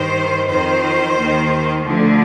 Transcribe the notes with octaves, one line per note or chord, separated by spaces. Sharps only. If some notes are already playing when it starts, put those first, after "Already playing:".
Already playing: G2 D#3 C5
F2 D#3 C5
D#2 D#3
D2 D3 F3